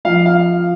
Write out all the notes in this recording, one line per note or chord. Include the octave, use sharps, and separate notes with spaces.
F3 F5
F5